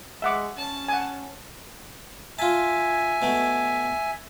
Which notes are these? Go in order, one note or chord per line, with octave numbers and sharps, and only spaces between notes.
G#3 E5 F#5 D6
C#4 A5
F#5 G#5
F4 E5 G#5 A5
B2 A3